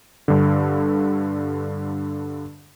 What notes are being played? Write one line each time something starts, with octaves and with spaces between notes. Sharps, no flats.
G2 D3